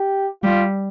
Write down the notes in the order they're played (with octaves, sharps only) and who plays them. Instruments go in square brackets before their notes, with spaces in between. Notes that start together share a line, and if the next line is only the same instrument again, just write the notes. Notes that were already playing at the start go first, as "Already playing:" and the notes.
Already playing: [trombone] G4
[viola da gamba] G3 [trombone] F4